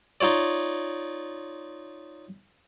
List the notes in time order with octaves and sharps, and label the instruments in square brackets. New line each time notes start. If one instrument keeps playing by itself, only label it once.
[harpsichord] D#4 F4 C#5 D5